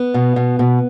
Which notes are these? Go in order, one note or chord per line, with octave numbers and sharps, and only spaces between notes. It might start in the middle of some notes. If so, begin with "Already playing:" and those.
Already playing: B3
B2
B2
B2